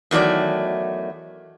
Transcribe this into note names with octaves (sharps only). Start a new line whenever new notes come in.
E2 D#3 F#3 A3 D5